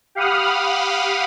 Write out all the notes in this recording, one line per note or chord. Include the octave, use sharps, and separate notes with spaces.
G4 F5 F#5 B5 D#6 F6